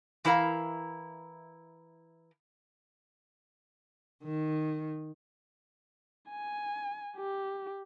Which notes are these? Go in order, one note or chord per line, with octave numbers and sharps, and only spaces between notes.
E3 E4 A#4 B4 F5 A#5
D#3
G#5
G4